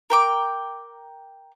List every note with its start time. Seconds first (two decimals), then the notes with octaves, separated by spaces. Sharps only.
0.10 A#4 G5 D6